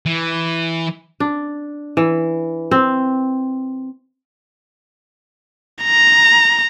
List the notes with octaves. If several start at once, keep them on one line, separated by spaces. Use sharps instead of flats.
E3
D4
E3
C4
A#5